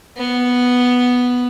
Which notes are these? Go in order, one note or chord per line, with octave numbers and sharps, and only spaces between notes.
B3